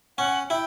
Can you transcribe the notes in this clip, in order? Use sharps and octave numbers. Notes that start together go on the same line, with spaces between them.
C#4 F#5
E4 G5